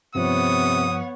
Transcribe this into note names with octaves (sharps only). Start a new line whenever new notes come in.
G2 C3 F3 B3 C#5 F#5 D#6